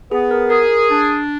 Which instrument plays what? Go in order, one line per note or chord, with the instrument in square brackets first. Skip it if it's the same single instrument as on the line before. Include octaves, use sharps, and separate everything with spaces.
[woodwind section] B3 [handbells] G#4
[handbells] A#4
[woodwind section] G#4 [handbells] A#4
[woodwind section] D4